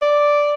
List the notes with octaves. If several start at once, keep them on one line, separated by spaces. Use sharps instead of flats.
D5